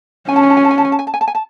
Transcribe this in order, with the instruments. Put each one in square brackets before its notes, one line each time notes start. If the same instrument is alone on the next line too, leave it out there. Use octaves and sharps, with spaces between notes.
[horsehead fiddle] C#4 [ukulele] G#5
[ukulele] A5
G#5
A5
G#5
A5
G#5
A5
G#5
A5
G#5
A5
G#5
A5
G#5
A5